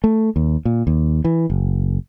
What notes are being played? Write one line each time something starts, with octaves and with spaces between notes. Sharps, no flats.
A3
D#2
A#2
D#2
E3
F#1